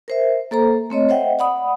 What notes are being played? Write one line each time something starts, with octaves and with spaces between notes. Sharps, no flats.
A#4 C5 E5
A#3 A4 C5 A#5
A3 C4 C#5 D#5
C5 D#5 E5 F#5 G5
D5 F#5 B5 D#6